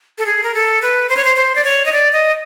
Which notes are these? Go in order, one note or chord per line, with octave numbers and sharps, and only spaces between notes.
A4
G#4
A#4
A4
B4
C5
C#5
C5
C5
D5
C#5
D#5
D5
D#5